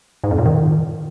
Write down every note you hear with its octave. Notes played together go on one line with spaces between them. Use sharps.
G#2
F2
A#2
D#3